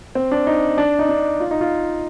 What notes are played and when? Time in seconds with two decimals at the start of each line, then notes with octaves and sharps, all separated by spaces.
0.15 C4
0.32 D4
0.47 D#4
0.78 D4
0.99 D#4
1.09 D4
1.40 F4
1.51 D#4
1.61 F4